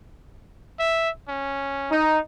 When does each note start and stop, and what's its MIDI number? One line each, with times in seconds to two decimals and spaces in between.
0.80 1.10 76
1.28 1.92 61
1.91 2.18 63